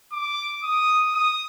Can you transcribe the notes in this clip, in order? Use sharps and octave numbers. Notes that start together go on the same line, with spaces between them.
D6
D#6
D#6